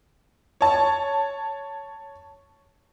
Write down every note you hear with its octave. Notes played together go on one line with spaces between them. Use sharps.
C#5 A5